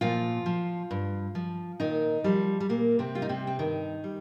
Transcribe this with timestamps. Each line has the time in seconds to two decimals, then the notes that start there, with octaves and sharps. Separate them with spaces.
0.01 A#2 F3 F4
0.46 F3
0.91 G2
1.35 F3
1.80 A#2 D#3 D#4
2.24 F3 G3
2.60 G3
2.69 A#2 A#3
2.99 C3 C4
3.15 G3 F4
3.22 D#4
3.29 C3 C4
3.47 C4
3.59 G2 D#3 D#4
4.04 G3